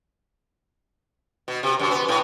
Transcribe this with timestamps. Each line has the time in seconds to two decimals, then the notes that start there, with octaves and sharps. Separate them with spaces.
1.48 B2
1.63 C3
1.79 F#2
1.91 B3
2.08 A2